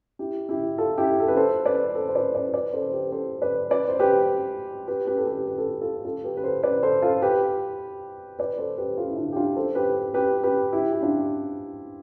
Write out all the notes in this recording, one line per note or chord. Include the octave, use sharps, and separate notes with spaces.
E4 G4
E4 G4
F4 A4
E4 G4
A4
B4
A4 C5
B4 D5
A4 C5
C5
B4 D5
B4 D5
B4 D5
A4 C5
C5
G4 B4
A4 C5
B4 D5
B4 D5
C5
G4 B4
G4 B4
G4 B4
A4
G4 B4
B4
A4
G4
F4 A4
F4 A4
G4 B4
B4
A4 C5
B4 D5
A4 C5
F4 A4
G4 B4
B4 D5
A4 C5
G4 B4
F4 A4
E4
D4 F4
G4
D4 F4
A4 C5
G4 B4
G4 B4
G4 B4
E4 G4
G4
D4 F4